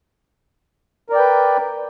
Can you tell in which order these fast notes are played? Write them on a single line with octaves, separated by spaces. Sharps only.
A#4 D5 G5 B4